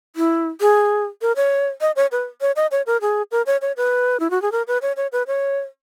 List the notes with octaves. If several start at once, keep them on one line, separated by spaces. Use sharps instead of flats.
E4
G#4
A#4
C#5
D#5
C#5
B4
C#5
D#5
C#5
A#4
G#4
A#4
C#5
C#5
B4
E4
F#4
G#4
A#4
B4
C#5
C#5
B4
C#5